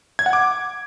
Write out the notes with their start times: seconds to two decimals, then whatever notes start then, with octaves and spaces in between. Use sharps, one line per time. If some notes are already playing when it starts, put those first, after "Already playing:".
0.19 G#6
0.26 F#5
0.33 D6